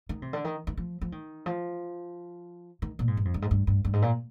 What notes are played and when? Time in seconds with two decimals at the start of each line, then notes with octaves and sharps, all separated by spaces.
0.09 D#3
0.22 C3
0.33 D3
0.45 D#3
0.67 D#3
0.77 F3
1.01 F3
1.12 D#3
1.46 F3
2.82 D#3
2.99 A#2
3.08 G#2
3.17 G2
3.25 F2
3.34 G2
3.42 G#2
3.51 G2
3.67 G2
3.85 G2
3.93 G#2
4.02 A#2